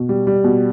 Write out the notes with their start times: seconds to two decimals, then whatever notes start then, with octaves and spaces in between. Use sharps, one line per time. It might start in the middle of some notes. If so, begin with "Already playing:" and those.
Already playing: B2
0.09 G3
0.27 G3
0.44 B2